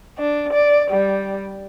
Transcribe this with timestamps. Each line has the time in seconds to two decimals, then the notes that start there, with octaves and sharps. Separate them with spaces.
0.18 D4
0.53 D5
0.91 G3